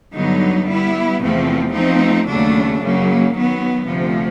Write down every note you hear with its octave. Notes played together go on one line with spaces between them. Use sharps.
G2 D3 F#3 B3 D#4
G3 B3 E4
E2 C3 F3 A3 C4
F3 A3 C4 D#4
D#2 C#3 F#3 A3 D4
F#2 C#3 F#3 A#3
D#3 F#3 B3
D2 C3 F3